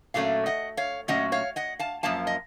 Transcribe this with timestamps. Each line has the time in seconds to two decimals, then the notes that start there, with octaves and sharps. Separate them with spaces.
0.14 A#2 F#3 A3 C#4 F5
0.46 D#5 F#5
0.77 C#5 F5
1.08 A#2 F#3 A3 C#4 D#5 F#5
1.32 C#5 F5
1.56 D#5 F#5
1.79 F5 A5
2.03 F#2 F3 A#3 F5 A5
2.27 D#5